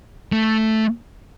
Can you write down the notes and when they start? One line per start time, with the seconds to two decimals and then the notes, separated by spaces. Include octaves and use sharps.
0.32 A3